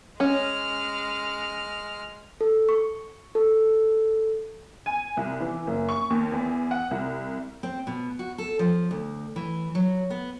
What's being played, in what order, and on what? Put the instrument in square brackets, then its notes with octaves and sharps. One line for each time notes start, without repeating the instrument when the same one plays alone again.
[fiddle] G#3 F6 [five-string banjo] C#4
[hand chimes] A4
C#6
A4
[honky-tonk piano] G#5
C2
E3
F#1
C#6
D#2
E2
F#5
C2
[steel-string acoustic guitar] C4
B2
F#4
A4
F3
D2
E3
F#3
B3